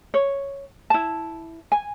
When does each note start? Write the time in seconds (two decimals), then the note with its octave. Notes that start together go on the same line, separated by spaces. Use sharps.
0.14 C#5
0.90 E4 A5
1.72 G#5